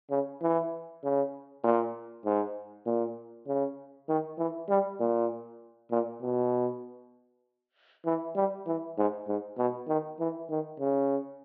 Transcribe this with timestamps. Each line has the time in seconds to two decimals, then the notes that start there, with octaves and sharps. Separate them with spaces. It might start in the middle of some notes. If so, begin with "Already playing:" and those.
0.11 C#3
0.42 E3
1.03 C#3
1.64 A#2
2.25 G#2
2.86 A#2
3.47 C#3
4.09 D#3
4.38 E3
4.69 G3
5.00 A#2
5.91 A#2
6.22 B2
8.06 E3
8.35 G3
8.67 E3
8.98 G#2
9.28 G#2
9.58 B2
9.88 D#3
10.20 E3
10.50 D#3
10.80 C#3